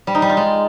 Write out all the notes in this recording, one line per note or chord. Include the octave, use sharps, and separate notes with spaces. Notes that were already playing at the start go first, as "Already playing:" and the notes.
G3
D#4
G3
F4
G#3